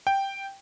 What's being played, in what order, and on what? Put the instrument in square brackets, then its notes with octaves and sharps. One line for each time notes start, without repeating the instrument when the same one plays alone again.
[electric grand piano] G5